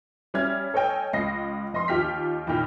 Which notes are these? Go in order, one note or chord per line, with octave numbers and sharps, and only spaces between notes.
G3 C#4 E5 F6 G#6
A4 C#5 D#5 G5 G#5
C#2 D#5 A#6 C7
F1 D#5 C6
D#2 D#4 F4 G4 F6 B6
E2 A#2 D#3 G5 F6